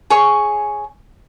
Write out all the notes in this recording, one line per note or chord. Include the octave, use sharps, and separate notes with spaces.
G#4 C#5 C#6